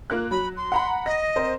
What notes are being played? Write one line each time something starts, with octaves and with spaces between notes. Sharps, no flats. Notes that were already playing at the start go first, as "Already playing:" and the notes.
A#3 F4 F#6
F#3 B5
C6
F#5 A#5 B5
D#5 A#6
C4 A#4 C5